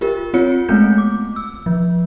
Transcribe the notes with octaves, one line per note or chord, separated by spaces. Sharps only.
F4 G4 A#4
C4 F4 C#5 C#7
G#3 A3 B3 C4 G6
D6
E6
F3